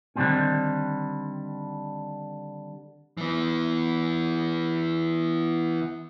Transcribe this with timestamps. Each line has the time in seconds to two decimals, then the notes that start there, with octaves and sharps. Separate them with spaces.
0.16 D3 D#3 F3 G3 C4 C#4
3.17 E3 B3